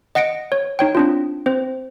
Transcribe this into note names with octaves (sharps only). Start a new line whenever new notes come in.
D#5 F#5 A#6 C#7 D7
C#5
D#4 C#5 G5
C4 D4 F4
C4 C5